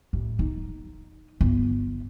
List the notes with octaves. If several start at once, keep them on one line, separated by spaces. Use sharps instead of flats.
A1
D#4
G1